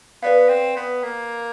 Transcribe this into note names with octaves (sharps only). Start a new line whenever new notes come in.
B3 B4 D5 F5
C4
B3
A#3